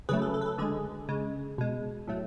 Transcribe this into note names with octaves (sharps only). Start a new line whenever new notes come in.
C#3 F#3 A3 G#4 B4
A4
A4
B4
A4
D3 G#3 G#4
C#3 G#3
B2 G#3
A2 F#3 A3